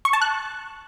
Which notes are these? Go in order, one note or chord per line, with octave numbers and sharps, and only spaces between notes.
C#6
A5
F#6